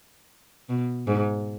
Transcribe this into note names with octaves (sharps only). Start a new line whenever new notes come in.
B2
G#2